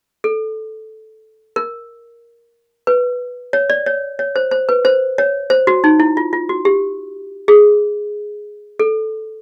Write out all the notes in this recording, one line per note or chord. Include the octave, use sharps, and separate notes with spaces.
A4
A#4
B4
C#5
D5
C#5
C#5
C5
C5
B4
C5
C#5
C5
F#4
D#4
E4
F4
F4
F#4
G4
G#4
A4